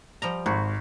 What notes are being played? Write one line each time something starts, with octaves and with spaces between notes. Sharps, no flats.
F3 G3 A#5
G#1 F#4